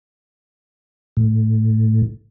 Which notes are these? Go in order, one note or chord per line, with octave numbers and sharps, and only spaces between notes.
A2